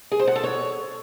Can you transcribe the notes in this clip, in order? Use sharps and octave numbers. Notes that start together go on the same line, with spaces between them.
G#4
C5
F#5
A4
C#5